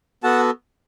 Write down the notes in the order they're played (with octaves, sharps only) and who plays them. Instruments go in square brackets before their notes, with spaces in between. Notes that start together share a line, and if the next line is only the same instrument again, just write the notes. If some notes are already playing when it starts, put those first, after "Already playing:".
[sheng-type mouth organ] B3 F#4 A4 F#5 A5